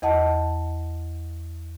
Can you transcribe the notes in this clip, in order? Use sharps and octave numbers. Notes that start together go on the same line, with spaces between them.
E2 D#5 F#5 A5